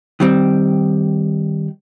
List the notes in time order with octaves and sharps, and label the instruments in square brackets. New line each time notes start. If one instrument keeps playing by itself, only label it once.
[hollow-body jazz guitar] D#3 G3 C4